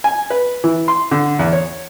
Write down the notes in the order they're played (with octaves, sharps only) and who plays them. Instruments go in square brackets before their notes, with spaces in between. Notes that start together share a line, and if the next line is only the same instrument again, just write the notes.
[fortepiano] G#5
B4
E3
C6
D3
E2
C#5